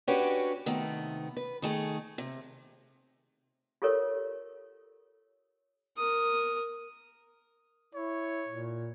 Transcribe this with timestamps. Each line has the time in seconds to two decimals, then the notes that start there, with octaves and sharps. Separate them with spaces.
0.08 C#4 D4 F#4 G4 B4 C#5
0.66 C3 D#3 A3 B3
1.37 B4
1.62 D#3 A3 G#4
2.18 C3
3.82 F4 G4 A4 A#4 C#5
5.97 A#4 D#6
7.95 E4 C#5
8.49 A#2